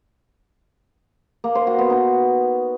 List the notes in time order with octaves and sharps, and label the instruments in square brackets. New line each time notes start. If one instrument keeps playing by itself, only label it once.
[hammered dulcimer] A#3
C5
F#4
B3
D#4